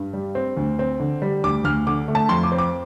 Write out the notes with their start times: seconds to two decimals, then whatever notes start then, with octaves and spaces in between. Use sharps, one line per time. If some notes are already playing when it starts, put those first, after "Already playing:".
Already playing: G2
0.14 G3
0.35 C4
0.57 D2
0.79 C4
1.00 D3
1.22 G3
1.44 D2 D6
1.64 D2 F6
1.87 D3 D6
2.08 A3
2.15 A5
2.29 F2 C6
2.44 D6
2.52 C4
2.58 D6